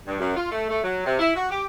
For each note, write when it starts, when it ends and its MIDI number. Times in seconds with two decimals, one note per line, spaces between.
0.07 0.18 43
0.20 0.35 42
0.36 0.47 65
0.51 0.67 57
0.70 0.81 57
0.83 1.05 54
1.06 1.19 48
1.19 1.31 64
1.36 1.48 66
1.50 1.65 67